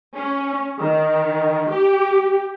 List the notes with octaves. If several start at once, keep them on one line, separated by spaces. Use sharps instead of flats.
C#4
D#3
G4